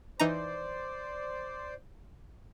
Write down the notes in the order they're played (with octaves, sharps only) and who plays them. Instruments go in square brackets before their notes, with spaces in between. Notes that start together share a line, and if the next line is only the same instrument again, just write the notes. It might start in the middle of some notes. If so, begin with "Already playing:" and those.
[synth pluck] E3 D#4 A#5 [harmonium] C5 D5